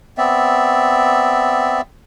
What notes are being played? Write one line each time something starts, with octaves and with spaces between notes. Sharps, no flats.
B3 C4 D5 E5